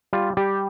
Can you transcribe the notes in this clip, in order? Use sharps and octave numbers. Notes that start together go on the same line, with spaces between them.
G3 F4
G3 G4